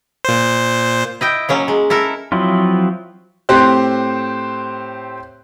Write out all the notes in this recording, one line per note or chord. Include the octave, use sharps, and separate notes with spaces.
A#2 C5
E4 D#5 G5
F#3 A#3 C#4
G#3
E4 A4 A#4
F3 F#3 C4 E4 F4
A2 C4 G4 C5 F#6